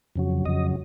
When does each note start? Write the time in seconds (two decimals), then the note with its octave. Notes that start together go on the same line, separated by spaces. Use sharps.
0.16 F2 C#3 F#3
0.45 F2 C#3 F#3 D#5